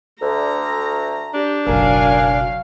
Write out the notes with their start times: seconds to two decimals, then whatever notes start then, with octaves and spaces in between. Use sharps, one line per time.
0.21 D2 A#5
1.34 D4 G4
1.67 F#1 B1 F#3 A#4 F5 G#5